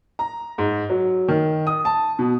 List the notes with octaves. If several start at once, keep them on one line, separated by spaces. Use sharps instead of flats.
A#5
G#2
F#3
D#3
D#6
A5
B2